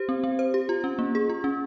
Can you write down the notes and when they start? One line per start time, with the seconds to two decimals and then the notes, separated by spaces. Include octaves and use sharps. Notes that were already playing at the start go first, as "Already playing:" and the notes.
Already playing: G4 C5
0.09 C4
0.24 C4
0.39 C5
0.54 G4
0.69 F4
0.84 C#4
0.99 A#3
1.15 G#4
1.29 F4
1.44 C#4